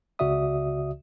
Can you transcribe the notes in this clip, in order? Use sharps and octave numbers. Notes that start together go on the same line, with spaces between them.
C#2 C#3 F#4 D5 E5 D#6